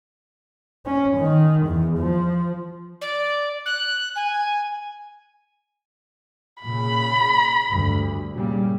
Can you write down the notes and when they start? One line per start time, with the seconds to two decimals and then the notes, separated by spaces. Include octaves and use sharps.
0.86 C#4
1.17 D#3
1.67 E2
1.98 F3
3.01 D5
3.65 F#6
4.15 G#5
6.63 A#2 C#3 B5
7.68 D2 G2
8.33 A#2 C#3 G3